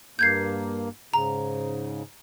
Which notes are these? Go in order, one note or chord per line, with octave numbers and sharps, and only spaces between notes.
G2 A#3 G6 G#6 C7
G#2 C#3 A#5